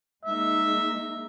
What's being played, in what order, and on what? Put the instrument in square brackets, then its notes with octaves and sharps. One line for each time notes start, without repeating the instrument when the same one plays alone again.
[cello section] G#3 A#3 D#4 [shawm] E5